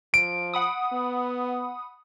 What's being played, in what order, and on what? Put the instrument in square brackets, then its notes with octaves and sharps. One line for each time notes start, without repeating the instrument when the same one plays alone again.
[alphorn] F3 [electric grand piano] D7
[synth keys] F#5 B5 D#6
[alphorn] B3